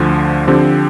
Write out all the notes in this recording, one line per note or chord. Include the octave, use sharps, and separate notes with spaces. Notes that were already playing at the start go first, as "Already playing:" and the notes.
Already playing: D2 D3 F3
D3 F3 C4 G4